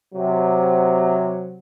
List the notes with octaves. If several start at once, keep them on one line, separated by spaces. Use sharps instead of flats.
C3 F#3